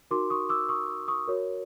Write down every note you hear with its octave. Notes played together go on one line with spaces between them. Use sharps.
D#4 F#4 A#4 C6 D6
C#6 D#6
D6 E6
C#6 D#6
C#6 D#6
F#4 A#4 C#5